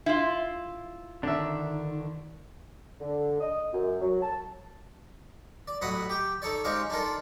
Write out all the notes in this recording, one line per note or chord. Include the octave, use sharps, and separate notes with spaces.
E4 F4
D3 D#3 D4 E5
D3
D#5
F#2
F#3
A5
D5
A1 F#3 D#5 F#5 B5 D#6
G4 G5
D#4 A4 C#5 D5
G#3 C4 C#4 D#4 G4 F5
D4 D#4 F4 A4 A#4